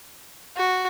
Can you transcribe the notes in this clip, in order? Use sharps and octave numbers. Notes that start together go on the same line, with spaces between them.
F#4